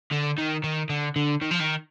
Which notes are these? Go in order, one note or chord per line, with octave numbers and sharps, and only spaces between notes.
D3
D#3
D#3
D3
D3
D#3
F3
D#3